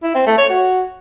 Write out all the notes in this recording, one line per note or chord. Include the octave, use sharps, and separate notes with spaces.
E4
C4
A3
C#5
F#4